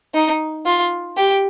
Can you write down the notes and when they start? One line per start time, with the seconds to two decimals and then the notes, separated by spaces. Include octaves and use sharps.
0.14 D#4
0.66 F4
1.17 G4